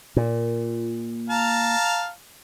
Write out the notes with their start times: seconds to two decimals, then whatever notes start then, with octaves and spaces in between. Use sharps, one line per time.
0.17 A#2
1.30 F5 A5 A#5